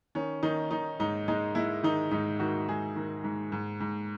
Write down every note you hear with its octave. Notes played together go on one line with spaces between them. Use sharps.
D#3 C#4
D#3 D#4
D#3 D#4
G#2 D#4
G#3 D#4
G#3 E4
D#3 D#4
G#2 D#4
D#3 F#4
G#2 G#4
D#3
G#2
G#2
G#2